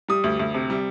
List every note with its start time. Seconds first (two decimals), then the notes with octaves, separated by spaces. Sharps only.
0.08 G3 D#6
0.24 D2
0.39 D2
0.54 C3
0.70 G3